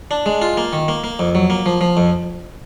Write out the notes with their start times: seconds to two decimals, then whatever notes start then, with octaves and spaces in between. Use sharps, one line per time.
0.11 D4
0.26 G#3
0.42 F4
0.57 A#3
0.73 D#3
0.88 A#3
1.04 A#3
1.19 F2
1.35 F#3
1.50 A#3
1.66 F3
1.81 F3
1.97 F2